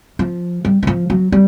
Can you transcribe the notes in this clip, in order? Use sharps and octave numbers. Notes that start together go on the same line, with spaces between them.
F3
G3
E3
F3
F#3
G3